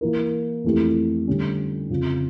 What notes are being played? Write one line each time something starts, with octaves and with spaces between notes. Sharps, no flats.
E3 A#3 E4 A#4
F2 E3 A3 E4 G4
D3 G3 C#4
F2 C#3 F3